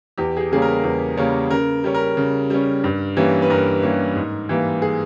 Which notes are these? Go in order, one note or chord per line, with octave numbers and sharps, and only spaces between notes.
E2 G4
G#4
G4
C#3 G3 A#3 C#4 G#4
A#4
E2
C#3 G3 A#3 C#4
C#3 A#4
G3 C#4
A#4
C#3
G3 C#4
G2
E3 G3 A#3 C#4
B4
G2 A#4
E3 G3 A#3 C#4
G#2
E3 G3 A#3
G#4